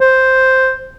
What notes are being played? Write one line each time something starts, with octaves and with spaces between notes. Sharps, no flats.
C5